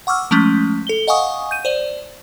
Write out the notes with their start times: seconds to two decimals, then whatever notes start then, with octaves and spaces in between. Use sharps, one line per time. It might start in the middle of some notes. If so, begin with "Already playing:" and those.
0.07 F#5 C#6 D6 E6 F6
0.31 F3 G#3 A3 C#4
0.87 A4 G7
1.07 D#5 F5 F#5 G#5 C#6 D#6
1.51 G6 D#7
1.65 C5 D5